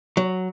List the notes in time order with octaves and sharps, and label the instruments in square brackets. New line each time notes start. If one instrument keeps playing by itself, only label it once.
[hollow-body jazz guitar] F#3